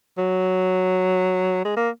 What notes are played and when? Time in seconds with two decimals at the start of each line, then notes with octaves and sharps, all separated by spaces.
0.17 F#3
1.65 G#3
1.77 A#3